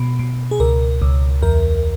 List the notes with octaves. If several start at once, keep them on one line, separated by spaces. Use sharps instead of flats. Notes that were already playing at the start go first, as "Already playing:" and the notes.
Already playing: B2
B2
G#4
C#2 A#4
C#2
E2 A#4